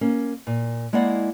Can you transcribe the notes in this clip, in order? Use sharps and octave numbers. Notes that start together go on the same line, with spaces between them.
A#3 C#4
A#2
G#3 A#3 E4 D5 F#5